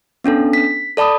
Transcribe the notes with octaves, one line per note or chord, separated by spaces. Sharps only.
B3 C#4 D4 A4
B6
A4 D5 A5 B5 D#6